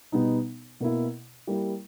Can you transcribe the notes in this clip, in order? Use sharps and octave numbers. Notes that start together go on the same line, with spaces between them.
B2 G3 B3 D#4
B2 A#3 E4
G3 A#3 E4